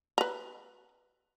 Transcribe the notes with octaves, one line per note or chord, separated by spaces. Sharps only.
B4 A#5